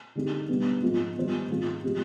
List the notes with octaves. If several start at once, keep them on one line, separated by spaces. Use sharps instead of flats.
D3 G#3 C4 D#4 G4
B2 G3 B3 D4
G#2 F3 C4 F4
D#3 G3 B3 F4 C5
G#2 D#3 G#3 C4 F4
C3 F3 G#3 C4 G4